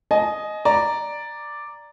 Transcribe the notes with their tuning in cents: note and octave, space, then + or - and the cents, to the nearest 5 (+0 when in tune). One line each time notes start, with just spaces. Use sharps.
D#5 +0 G#5 +35
D5 +0 A#5 +0